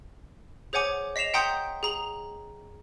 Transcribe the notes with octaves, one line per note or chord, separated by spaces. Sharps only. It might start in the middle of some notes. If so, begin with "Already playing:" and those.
G#4 C5 C#5 F#5 G#5 D6
D#5 B6 C7 E7 F7
F#5 G5 A#5 C6 D#6 G6
G#4 A#5 F#7